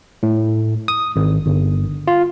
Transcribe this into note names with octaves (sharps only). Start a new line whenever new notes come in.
A2
D#6
G#1
G1
F4